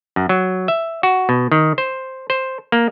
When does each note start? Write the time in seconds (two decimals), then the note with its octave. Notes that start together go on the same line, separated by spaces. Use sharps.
0.16 F#2
0.29 F#3
0.68 E5
1.03 F#4
1.29 B2
1.52 D#3
1.78 C5
2.30 C5
2.72 A#3